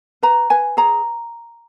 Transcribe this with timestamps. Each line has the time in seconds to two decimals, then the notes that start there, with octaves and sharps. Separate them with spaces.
0.23 B4 A#5
0.50 B4 G#5
0.77 G#4 A#5